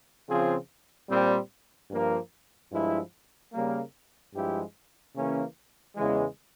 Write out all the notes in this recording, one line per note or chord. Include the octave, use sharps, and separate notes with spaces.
C#3 F3 C4 F4 G#4
A#2 G3 C4
G2 F3 A#3
G2 F3 G#3 E4
C#3 G3 A#3
G2 F3 G#3 E4 G4
C#3 E3 A#3 C#4
E2 C#3 E3 G#3